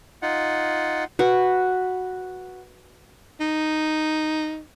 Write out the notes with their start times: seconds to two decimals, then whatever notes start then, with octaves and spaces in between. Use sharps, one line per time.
0.22 D#4 F4 F#5
1.19 F#4 B4
3.40 D#4